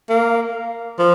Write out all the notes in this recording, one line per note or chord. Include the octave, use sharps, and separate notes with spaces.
A#3
F3